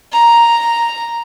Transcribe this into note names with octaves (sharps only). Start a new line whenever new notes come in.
A#5